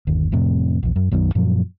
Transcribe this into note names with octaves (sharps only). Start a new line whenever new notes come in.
G1 D#2
F2 A2 C3
A#1 E2
F#2
B1 F#2 B2 D#3
F#2 A#2 F3 F#3